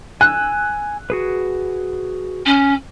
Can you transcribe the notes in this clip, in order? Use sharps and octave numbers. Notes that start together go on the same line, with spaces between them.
G#5 E6 F#6
F#4 G#4 B4
C#4